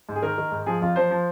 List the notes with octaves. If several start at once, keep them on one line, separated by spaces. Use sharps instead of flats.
G#2
G#4
D#3 A#4
D#3
G#2
F3 G#4
F2 F4
F3 C5
F3